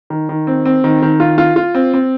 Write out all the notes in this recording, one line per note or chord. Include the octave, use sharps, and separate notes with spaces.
D#3
D#3
C4
C4
D#3
D#3
F4
F4
F4
C4
C4